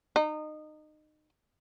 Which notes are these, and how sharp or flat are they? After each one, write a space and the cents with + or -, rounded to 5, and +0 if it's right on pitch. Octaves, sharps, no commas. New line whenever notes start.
D#4 -25